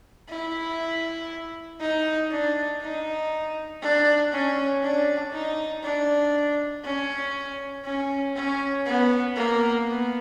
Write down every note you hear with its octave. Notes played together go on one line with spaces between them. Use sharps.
E4
D#4
D4
D#4
D4
C#4
D4
D#4
D4
C#4
C#4
C#4
B3
A#3
B3